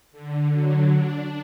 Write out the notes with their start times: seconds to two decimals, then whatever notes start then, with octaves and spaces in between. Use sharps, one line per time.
0.12 D3
0.52 F#3
0.92 D4